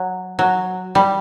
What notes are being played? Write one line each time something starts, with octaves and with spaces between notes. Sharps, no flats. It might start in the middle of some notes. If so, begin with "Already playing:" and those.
Already playing: F#3
F#3
G3